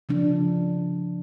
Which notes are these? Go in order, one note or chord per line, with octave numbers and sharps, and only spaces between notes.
C#3 F3 D4